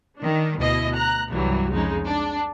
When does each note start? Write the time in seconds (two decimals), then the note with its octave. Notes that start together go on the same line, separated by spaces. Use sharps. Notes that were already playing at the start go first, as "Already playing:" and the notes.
0.19 D#3 D4
0.59 D2 B2 E4 D#5
0.95 A#5 F#6
1.31 C2 G2 E3 F#3 G3
1.72 F2 C#3 G#3 D#4
2.06 D4